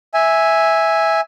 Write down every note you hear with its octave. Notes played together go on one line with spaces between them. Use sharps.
E5 G#5